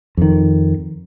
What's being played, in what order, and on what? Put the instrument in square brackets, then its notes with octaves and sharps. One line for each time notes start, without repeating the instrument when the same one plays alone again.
[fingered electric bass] F2 D#3